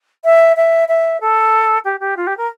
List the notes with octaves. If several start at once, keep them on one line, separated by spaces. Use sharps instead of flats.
E5
E5
E5
A4
G4
G4
F4
G4
A#4